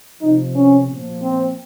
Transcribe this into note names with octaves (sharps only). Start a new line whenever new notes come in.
C3 F3 D#4
C#4
A#2 F3
C4